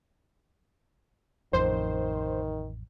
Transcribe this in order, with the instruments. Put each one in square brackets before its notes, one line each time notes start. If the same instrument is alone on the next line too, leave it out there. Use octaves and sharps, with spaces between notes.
[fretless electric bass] A1 F2 [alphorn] D#3 [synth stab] C5